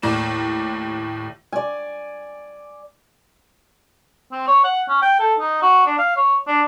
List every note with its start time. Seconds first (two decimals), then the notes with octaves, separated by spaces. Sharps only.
0.02 D#2 A2 D5 E7
1.52 D5 G#5
4.32 C4
4.48 C#5
4.64 F#5
4.88 C#4
5.02 G5
5.20 A4
5.39 D#4
5.62 F#4
5.86 D4
5.99 F5
6.16 C#5
6.47 D4